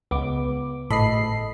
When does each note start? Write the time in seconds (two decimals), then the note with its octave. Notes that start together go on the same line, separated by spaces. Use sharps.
0.11 C#2 B3 D6
0.90 G#1 A2 A4 D#5 B5 C7